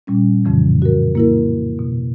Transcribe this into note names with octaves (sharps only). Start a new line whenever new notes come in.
A#2 G3 C#4
F2 A2 C#3 E3 F3
F#4 A#4
A#3 E4 A#4
B2